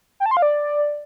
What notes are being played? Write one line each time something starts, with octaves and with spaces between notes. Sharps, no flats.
G5
A5
C6
F5
D5